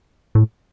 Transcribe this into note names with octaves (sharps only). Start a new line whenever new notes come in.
A2